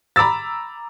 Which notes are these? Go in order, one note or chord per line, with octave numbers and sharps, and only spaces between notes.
A#5 B5 D6 E6 A6